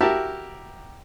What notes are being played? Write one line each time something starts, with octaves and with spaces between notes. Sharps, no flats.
E4 F#4 G4 A#4 E5 A5